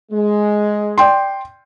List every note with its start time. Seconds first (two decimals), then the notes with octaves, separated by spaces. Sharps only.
0.12 G#3
0.98 D5 G5 C6